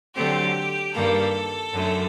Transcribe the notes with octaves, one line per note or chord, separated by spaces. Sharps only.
D3 F#3 A3 C4 G4
G2 D#3 G3 A#3 A4
F#2 D3 A3